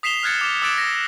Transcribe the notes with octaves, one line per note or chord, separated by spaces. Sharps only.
D#6 B6 C7 E7 F7 G7
F6 F#6 G#6 A6 C#7
D6 C#7
D6 E6 F#6 A6 D7 E7
A#6